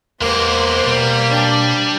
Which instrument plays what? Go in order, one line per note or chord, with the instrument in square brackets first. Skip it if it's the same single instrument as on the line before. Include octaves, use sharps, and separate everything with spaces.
[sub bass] E2 [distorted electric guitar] G#3 G4 [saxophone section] A#3 [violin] B3 C5
[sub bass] B2 [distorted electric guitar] G3
[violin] D4 G5